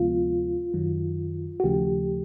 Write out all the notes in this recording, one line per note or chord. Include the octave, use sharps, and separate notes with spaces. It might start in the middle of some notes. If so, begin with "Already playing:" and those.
Already playing: D2 C3 F3 G#3 B3 F4
F#2 D#3 F#3
F#4
D#2 C#3 F3 A3 G4